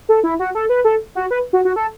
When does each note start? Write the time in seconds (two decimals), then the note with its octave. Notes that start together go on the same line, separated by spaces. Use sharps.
0.09 A4
0.24 E4
0.39 F#4
0.55 A4
0.69 B4
0.84 A4
1.15 F#4
1.31 B4
1.53 F#4
1.65 F#4
1.76 A4